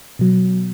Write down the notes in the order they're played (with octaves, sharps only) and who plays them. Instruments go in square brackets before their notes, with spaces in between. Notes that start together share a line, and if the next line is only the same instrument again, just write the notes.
[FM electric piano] B2 F#3